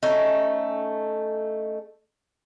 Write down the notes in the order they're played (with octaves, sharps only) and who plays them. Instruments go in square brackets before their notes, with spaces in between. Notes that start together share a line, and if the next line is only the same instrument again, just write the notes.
[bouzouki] A3 C#4 D#4